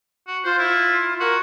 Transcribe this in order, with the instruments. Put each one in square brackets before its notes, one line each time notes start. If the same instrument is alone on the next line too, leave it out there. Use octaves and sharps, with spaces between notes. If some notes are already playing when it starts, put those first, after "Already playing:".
[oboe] F#4
[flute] F4 [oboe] C5
[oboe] E4
[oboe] F#4 [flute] A#4